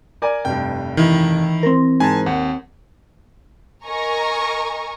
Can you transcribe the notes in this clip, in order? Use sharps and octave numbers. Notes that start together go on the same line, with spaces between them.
A#4 D5 G#5
F1 G2 G5
D#3 E3 E4
C4 A#4
G#2 G#5 A5
D#2 F#5
A#4 D#5 G#5 A#5 C#6